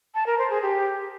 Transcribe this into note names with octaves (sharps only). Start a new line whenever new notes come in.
A5
A#4
C5
G#4
G4